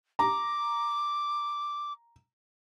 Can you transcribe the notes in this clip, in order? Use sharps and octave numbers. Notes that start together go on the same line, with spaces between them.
A#5 D6